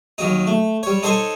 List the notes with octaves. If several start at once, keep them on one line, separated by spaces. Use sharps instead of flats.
D#2 F#3 D#4
A3
G3 C#5
D#4 A4 C5 C#5 G#5